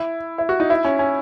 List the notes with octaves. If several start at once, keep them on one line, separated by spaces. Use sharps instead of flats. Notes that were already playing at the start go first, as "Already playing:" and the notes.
Already playing: E4
E4
F#4
D#4
E4
C#4
C#4